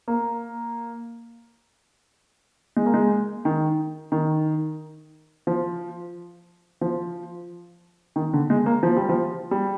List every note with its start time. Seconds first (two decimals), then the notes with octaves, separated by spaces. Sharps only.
0.08 A#3
2.77 G#3
2.86 A#3
2.94 G#3
3.45 D#3
4.12 D#3
5.47 F3
6.81 F3
8.16 D#3
8.33 D3
8.50 G#3
8.66 A#3
8.83 F3
8.97 G3
9.09 F3
9.51 G3